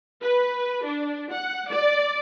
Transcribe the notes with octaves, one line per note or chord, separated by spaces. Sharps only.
B4
D4
F#5
D5